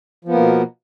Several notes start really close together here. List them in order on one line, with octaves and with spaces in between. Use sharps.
F3 B3 A#3 B2